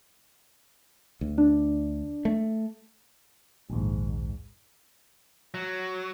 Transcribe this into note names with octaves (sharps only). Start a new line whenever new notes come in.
D2
D4
A3
A#1 D#2 G#2
F#3